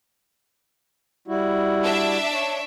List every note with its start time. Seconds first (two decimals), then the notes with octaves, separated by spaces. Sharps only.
1.28 G3 E4 F#4
1.83 D4 E5
2.33 C#5